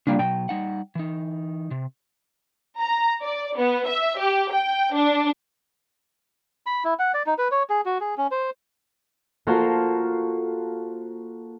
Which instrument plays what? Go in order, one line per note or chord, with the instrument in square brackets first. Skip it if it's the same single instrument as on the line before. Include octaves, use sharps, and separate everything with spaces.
[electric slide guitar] C#3 F4 G5 [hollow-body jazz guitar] G3 A#3 D4
[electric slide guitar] B2 F#3 [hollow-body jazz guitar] G5
[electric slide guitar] G3 D#4 F#5
E3 D#4
C3
[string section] A#5
D5
B3
E5
G4
G5
D4
[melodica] B5
E4
F#5
D5
D#4
B4
C#5
G#4
F#4
G#4
C#4
C5
[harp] A#3 F4 F#4 A4 A#4 C5